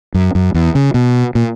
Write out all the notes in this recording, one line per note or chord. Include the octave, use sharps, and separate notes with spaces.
F#2
F#2
E2
C#3
B2
A#2